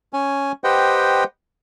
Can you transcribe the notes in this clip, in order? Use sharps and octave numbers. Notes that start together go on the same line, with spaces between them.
C#4 G#5
G4 B4 C5 D#5 F#5 G5